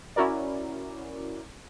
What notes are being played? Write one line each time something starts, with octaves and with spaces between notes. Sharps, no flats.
C#4 E4 F#4 A#4 D5